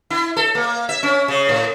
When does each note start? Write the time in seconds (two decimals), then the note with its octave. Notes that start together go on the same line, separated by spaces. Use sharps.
0.10 E4
0.37 A4
0.55 A#3
0.89 E5
1.03 C#4
1.28 C#3
1.49 A2